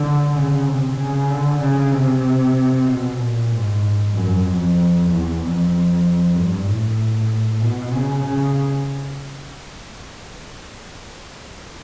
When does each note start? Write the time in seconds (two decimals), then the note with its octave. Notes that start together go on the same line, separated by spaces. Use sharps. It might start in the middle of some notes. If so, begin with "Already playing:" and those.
Already playing: D3
0.34 C#3
0.66 C3
0.97 C#3
1.29 D3
1.61 C#3
1.92 C3
2.87 B2
3.19 A#2
3.51 G#2
4.13 F#2
4.45 F2
5.08 E2
5.40 F2
6.35 G2
6.66 A2
7.61 B2
7.93 C#3
8.24 C#3